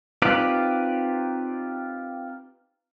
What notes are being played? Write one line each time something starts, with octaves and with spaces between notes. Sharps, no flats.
C4 D#4 F4 G4 B4 D5